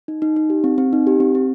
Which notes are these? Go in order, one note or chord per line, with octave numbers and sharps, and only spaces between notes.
D#4
D#4
D#4
G4
C4
C4
D#4
G4
C4
C4